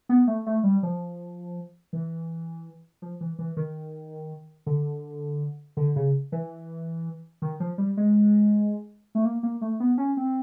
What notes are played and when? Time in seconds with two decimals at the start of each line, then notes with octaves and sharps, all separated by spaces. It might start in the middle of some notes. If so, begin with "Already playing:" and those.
0.09 B3
0.27 A3
0.46 A3
0.64 G3
0.83 F3
1.93 E3
3.02 F3
3.21 E3
3.39 E3
3.57 D#3
4.67 D3
5.77 D3
5.96 C#3
6.32 E3
7.42 D#3
7.60 F3
7.78 G3
7.97 G#3
9.15 A3
9.25 A#3
9.43 A#3
9.61 A3
9.80 B3
9.98 C#4
10.17 C4